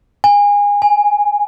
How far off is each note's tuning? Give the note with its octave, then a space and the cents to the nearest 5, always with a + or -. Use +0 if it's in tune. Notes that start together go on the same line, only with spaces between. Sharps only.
G#5 -25
G#5 +5